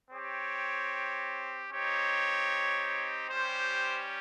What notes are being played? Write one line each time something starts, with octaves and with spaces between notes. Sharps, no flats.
C4 G4 C#5
C4 D#4 G4 C#5
G3 C#4 G4 C5